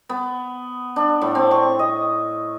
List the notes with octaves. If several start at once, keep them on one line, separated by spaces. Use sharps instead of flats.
B3
D4
A2
C4
C#6
D#5